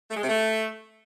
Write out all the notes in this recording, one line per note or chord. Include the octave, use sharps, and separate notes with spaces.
A3
G#3
C3
A3